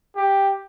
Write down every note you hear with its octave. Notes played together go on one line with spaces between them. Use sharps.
G4